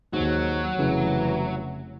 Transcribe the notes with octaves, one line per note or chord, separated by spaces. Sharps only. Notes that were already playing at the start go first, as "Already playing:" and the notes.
D#2 G#2 F#3
F1 C#3 E3